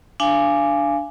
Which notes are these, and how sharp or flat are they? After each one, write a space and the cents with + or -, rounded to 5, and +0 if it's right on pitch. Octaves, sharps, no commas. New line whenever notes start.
D4 +0 F5 -25 G#5 +0